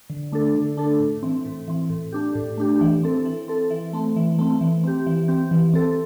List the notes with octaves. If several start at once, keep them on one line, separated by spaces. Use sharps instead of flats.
D3
A3 D4 A4
D3
A3 D4 A4
A2
E3 C4
A2
E3 C4
A2
A3 D4 G4
A2
A3 D4 G4
E3
C4 A4
E3
C4 A4
E3
A3 C4
E3
A3 C4
E3
C4 G4
E3
C4 G4
E3
C4 A4